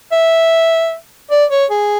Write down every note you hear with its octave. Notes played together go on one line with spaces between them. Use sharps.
E5
D5
C#5
G#4